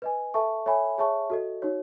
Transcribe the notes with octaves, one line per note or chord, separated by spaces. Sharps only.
B4 D#5 G#5
A4 E5 A5 C#6
A4 C#5 E5 G#5 B5
G#4 C#5 E5 A5 C#6
F#4 A4 D#5
D#4 F#4 C#5